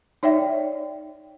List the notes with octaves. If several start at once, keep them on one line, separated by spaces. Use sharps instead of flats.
D#4 C#5 D5 E5 G5